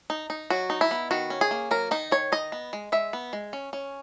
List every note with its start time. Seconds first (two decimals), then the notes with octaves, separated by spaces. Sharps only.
0.10 D#4
0.30 D#4
0.50 F#3 F#4
0.70 D#4
0.81 E4
0.91 B3
1.11 D#3 F#4
1.30 C#4
1.41 G#4
1.51 A#3
1.71 F#3 A#4
1.91 D#3 D#4
2.11 D#3 C#5
2.32 D#4 D#5
2.52 B3
2.73 G#3
2.92 G#3 E5
3.13 B3
3.33 G#3
3.53 C#4
3.73 C#4